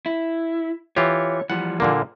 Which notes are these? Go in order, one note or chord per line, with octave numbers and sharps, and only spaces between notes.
E4
E3 F4 G4 C#5
E3 F3 G3 F#5
A#2 D3 A#3